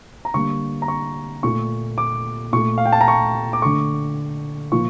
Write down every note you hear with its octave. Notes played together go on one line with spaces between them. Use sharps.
A#5
D3 G3 A#3 C#6
A#5
C#6
A#2 A3 C#6
D6
A#2 A3 C#6
F5
G5
A5
A#5
C#6
D6
D3 A3 C#6
A#2 F3 A#3 C#6